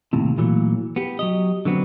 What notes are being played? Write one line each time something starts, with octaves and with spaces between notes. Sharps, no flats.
D#2 A2 C3
A#2 E3 F#3 A3
B3 G4
F#3 G4 D#5
D3 F#3 B3 C4